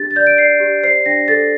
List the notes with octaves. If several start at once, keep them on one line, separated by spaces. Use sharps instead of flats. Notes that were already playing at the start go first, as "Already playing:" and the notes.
Already playing: D4 G4 A6
A6
D5 G6
D7
D5 C7
G4
C5 C7
D4 A#6
A4 A6